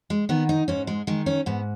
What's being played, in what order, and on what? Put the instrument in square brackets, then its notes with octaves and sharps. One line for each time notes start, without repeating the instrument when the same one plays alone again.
[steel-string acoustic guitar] G#3
D#3 B3
D#4
G#2 C#4
G#3
D#3 G#3
C#4
G#2 B3